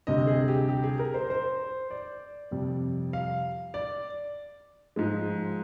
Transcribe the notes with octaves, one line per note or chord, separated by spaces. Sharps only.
D2 C3 G3 D#5
G#4
G4
G4
G#4
A#4
C5
C5
D5
F2 C3 G3
F5
D5
G#2 F3 G#3